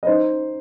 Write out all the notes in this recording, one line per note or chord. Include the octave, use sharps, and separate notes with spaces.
D#5
D#4 C5